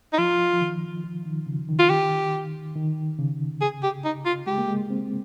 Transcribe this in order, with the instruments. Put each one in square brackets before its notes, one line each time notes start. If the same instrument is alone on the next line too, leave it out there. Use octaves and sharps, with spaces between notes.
[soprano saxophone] D#4
[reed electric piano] F3 [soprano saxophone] F4
[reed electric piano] F3
D#3
F3
D#3
C#3
D#3
[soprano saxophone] F4
G4
[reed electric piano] D#3
C#3
[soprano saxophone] G#4
G4
D#4
F4
[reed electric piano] G#3 [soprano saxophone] G4
[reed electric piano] A#3
G#3
C4